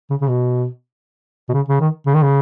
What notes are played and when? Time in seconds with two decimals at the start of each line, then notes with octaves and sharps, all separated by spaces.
0.10 C#3
0.21 C#3
0.29 B2
1.49 B2
1.53 C#3
1.68 C#3
1.80 D#3
2.06 C#3
2.15 D#3
2.22 C#3